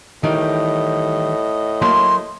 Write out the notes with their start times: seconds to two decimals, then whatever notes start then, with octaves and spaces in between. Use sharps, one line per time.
0.24 A2 D#3 E3 G3 D#5
1.82 F#3 A3 A#3 C6